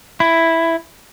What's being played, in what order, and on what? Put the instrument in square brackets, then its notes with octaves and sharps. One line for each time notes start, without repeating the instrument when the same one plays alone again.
[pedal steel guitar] E4